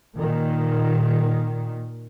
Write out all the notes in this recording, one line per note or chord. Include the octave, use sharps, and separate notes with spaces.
A#2 D#3